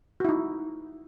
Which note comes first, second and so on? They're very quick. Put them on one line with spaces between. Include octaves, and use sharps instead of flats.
F#4 E4 D#4